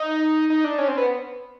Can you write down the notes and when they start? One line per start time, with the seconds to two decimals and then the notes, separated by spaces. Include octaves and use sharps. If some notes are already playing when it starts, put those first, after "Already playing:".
Already playing: D#4
0.50 D#4
0.65 D4
0.78 C#4
0.88 C4
0.97 B3